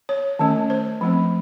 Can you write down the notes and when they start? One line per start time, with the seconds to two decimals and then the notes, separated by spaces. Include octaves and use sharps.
0.09 C#5
0.39 D#3 A3 C#4
0.70 C5
1.01 F3 A3 C4